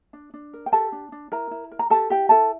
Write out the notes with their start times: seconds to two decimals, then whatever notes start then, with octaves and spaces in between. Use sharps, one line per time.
0.13 D4
0.34 D4
0.53 A#4
0.66 G5
0.72 G4 A4 A5
0.92 D4
1.12 D4
1.32 E4 A#4 A#5
1.51 E4
1.72 A#4
1.79 A#5
1.90 G4 A4 A5
2.10 E4 G4 G5
2.29 E4 A4 A5